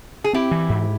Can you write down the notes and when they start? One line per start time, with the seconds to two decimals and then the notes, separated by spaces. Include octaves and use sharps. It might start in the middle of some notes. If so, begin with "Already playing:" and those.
0.24 G#4
0.33 C4 E4 G4
0.51 E3
0.69 G#2